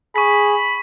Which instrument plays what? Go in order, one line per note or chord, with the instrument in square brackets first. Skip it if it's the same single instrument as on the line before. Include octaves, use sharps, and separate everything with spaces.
[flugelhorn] G#4 [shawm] B5 [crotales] C#6 B6